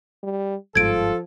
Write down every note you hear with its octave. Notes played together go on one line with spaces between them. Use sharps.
G3
G1 G#2 F3 F4 A4 G#6 D7